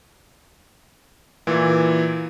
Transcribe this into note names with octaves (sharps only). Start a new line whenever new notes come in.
A#2 E3